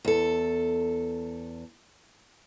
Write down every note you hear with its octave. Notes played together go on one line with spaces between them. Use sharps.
E2 A4